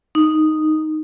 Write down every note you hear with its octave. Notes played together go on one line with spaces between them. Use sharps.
D#4